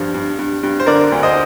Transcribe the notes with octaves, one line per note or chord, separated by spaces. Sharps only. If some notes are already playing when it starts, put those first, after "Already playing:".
Already playing: G2 F3
G2
G2
G2
C5
D3 A#4 D5
D2
C5 D#5